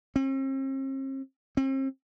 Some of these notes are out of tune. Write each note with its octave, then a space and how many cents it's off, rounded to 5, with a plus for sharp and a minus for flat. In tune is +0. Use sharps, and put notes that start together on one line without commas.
C4 +45
C4 +40